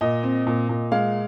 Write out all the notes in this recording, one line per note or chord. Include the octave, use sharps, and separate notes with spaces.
A#2 D#5
C4
A#2
A#2
G#3 F5